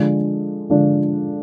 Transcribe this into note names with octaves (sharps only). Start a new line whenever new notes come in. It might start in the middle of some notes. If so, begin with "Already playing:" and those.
Already playing: D3 F3 G#3 D4
D3 F3 G#3 D4